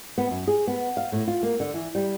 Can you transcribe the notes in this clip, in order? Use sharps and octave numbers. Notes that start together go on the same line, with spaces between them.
B3
F#2
G#4
B3
F5
A2
F4
A#3
D3
E3
G3